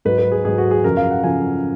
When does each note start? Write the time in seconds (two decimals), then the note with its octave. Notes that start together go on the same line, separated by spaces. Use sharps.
0.05 G#2 F#3 B4
0.18 B4
0.32 G#4
0.45 G#2 F#3 G#4
0.58 F#4
0.71 G#4
0.84 F#2 C#3 F3 A#4
0.97 F5
1.11 F#5
1.24 F#2 C#3 F3 G#5